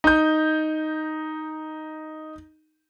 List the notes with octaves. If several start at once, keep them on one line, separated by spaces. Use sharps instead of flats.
D#4 G6